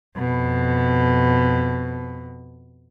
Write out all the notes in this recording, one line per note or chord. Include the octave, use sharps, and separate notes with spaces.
F2 B2